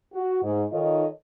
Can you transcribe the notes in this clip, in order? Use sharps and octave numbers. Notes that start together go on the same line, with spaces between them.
F#4
G#2
D#3 D#4 F4 A4 C#5 D#5